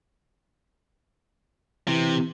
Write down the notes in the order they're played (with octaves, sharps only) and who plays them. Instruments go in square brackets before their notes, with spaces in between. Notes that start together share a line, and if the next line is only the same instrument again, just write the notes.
[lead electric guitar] C3 [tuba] E3